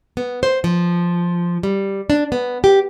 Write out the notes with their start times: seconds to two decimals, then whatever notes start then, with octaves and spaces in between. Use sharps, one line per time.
0.17 B3
0.43 C5
0.64 F3
1.63 G3
2.10 D4
2.32 B3
2.64 G4